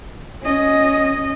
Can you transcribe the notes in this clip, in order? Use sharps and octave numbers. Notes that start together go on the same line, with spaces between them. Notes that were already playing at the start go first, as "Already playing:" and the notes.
C#4 D#5